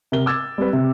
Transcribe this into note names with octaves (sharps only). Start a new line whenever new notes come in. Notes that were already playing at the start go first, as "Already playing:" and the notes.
C3 A#4 G7
D6 E6 G#6 A6
G3 C4 B4
C3